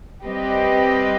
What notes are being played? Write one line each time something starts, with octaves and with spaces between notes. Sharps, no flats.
G3 C4 G4 B4 D#5